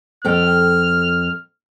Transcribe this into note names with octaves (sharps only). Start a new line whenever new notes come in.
F2 A4 G5 F6